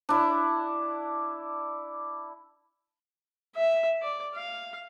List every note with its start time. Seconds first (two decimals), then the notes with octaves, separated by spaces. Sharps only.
0.09 D4 E4
3.56 E5
4.02 D5
4.35 F5